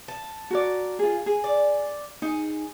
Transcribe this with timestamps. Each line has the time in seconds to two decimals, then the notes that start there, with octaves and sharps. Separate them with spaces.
0.08 A5
0.50 F#4 A#4 D5
0.99 F4 G#4
1.26 G#4
1.44 D5
2.22 D#4 G#4